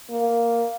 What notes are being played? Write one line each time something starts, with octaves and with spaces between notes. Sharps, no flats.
A#3